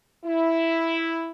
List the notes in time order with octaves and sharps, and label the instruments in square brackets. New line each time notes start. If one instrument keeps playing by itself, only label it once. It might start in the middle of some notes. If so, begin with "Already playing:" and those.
[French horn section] E4